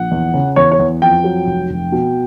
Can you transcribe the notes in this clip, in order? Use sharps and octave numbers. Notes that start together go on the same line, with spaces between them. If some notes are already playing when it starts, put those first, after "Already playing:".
Already playing: A#1 F#5
E2
C#3
E2 C#5
C#5
E2
F2 G5
F#3
F1
F1
B2